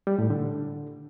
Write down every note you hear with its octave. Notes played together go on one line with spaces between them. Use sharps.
G3
A2
D3